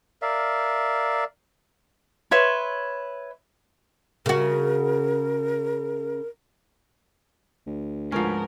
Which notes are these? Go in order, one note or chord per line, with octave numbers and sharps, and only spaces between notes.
A#4 D5 E5 F5
B4 C#5 E5 C6
C#3 F#4 A#4
D2
G#2 F3 B3 C#4 A#4